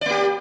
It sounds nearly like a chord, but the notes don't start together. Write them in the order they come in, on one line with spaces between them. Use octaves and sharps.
D5 A#3 G4